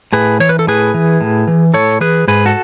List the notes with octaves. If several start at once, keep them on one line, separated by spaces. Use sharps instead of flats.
A2 G#4 B4
E3 C#5
B4
A4
A2 G#4 B4
E3
A2
E3
A2 A4 C#5
E3 G#4 B4
G#2 G#4 B4
F#4 A4